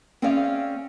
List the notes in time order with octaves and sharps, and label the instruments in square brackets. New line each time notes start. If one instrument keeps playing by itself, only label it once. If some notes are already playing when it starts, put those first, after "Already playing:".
[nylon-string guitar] C4 C#4 G#4 D5 E5 F5